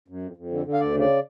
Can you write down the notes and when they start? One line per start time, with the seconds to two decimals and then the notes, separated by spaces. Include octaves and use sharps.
0.08 F#2
0.22 F2
0.37 F2
0.51 D3
0.66 D3
0.73 F5
0.80 D2 D5
0.94 C#3
1.00 D5